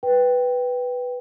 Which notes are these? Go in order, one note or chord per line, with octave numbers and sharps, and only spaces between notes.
B4 G5